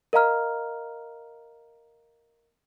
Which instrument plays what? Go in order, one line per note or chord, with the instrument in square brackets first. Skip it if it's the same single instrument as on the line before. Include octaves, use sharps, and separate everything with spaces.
[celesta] A#4 D#5 F5 A#5 F6